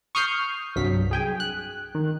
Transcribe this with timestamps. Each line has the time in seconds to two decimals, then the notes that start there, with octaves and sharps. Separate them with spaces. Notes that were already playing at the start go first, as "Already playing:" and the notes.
0.15 C#6 D#6 F6 G6 C7
0.76 C2 G2 F#3 B6
1.11 G#4 G5 G#5
1.40 F#6
1.95 D#3